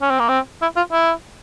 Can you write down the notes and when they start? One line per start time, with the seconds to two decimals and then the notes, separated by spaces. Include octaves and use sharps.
0.01 C#4
0.10 C4
0.19 A#3
0.28 C4
0.62 E4
0.77 F4
0.92 E4